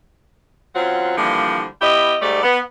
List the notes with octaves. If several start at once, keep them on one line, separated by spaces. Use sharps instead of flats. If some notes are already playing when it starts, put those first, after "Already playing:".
F#2 F#3 C4 F4 F#5
D3 E3 F3 G3 A#3
B3 E4 G4 D#5
G#2 G3 A3 D5
B3